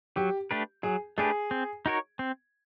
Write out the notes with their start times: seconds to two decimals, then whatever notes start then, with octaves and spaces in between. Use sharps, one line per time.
0.16 F#3 G4
0.51 A3 D4 G4 B4
0.83 F#3 G#4
1.18 A3 D4 G4 G#4 B4
1.51 C4
1.86 D#4 F#4 A#4 C#5
2.19 C4